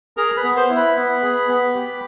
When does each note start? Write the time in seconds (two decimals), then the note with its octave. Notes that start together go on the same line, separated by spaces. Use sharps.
0.17 G#4 A#4 A#5
0.37 B4 B5
0.44 B3
0.57 C5 C6
0.69 E4
0.76 B4 B5
0.96 B3
1.22 G#4
1.48 B3
1.75 G4